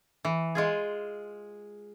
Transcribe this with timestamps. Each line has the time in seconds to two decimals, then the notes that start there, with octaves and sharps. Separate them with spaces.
0.25 E3
0.55 G#3 F4 G#4